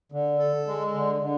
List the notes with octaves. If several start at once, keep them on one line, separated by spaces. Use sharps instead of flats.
D3
A4
G#3
D3
D3